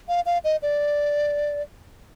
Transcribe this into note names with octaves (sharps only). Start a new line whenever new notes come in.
F5
F5
D#5
D5